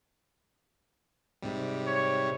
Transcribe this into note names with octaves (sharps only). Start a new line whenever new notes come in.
G#2 C3 G3
C#5